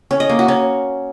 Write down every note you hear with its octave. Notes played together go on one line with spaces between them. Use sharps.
C#4
D#5
A#3
F#4
C#4